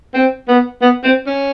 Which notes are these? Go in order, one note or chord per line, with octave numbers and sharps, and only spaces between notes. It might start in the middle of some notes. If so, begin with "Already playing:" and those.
C4
B3
B3
C4
C#4